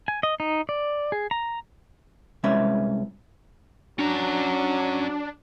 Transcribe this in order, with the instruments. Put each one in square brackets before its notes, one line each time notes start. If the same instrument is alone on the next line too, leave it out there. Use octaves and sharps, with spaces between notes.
[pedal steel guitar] G#5
D#5
D#4
D5
G#4
A#5
[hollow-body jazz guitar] C2 G#3 C#4 B4 E5
[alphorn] F#3 [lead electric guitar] C#4 A#5 [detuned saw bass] D4